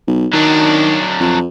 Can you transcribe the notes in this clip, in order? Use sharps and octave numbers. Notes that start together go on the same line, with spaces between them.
B1
D#3 F#3 D4
F2